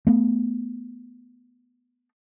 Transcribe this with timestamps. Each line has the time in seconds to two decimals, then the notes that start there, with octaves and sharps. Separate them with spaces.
0.07 A3 B3